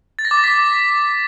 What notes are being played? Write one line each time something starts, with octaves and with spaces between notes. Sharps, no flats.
A6
A#6
D6
A6
B6